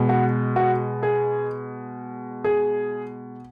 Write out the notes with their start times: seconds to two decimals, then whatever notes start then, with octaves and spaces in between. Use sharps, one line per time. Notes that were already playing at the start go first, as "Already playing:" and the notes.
Already playing: B2 G#3
0.09 F#4
0.56 F#4
1.03 G#4
2.44 G#4